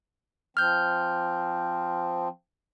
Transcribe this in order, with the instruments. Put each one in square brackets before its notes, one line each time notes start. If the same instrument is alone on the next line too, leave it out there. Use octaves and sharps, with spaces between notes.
[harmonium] F3 C4 [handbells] F6 G6